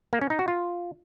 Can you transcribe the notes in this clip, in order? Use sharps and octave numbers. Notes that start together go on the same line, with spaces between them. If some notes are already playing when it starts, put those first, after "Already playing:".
A#3
C#4
D#4
F#4
F4